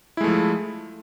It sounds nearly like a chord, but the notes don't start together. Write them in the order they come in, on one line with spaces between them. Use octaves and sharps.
E4 G#3 A3 F3